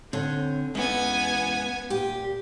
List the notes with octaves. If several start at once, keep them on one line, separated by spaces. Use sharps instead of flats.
D3 C4 C#5
E2 E3 G#3 B3 C#4 G#5
A#2 G4